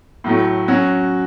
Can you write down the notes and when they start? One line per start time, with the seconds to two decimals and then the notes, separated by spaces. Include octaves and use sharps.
0.24 A2 F#3 A3
0.68 F#3 C#4 F#4